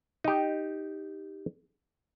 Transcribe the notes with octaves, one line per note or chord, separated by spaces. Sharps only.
D#4 G4